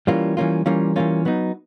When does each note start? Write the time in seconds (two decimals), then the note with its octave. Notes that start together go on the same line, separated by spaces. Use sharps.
0.07 E3 G3 A#3 C#4 F4
0.37 E3 G3 A#3 C#4 F4
0.66 E3 G3 A#3 C#4 F4
0.96 E3 G3 A#3 C#4 F4
1.25 F#3 B3 D#4